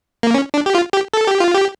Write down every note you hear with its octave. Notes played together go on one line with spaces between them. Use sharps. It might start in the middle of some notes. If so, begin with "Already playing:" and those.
A#3
C#4
D4
G4
F4
G4
A4
G4
F4
G4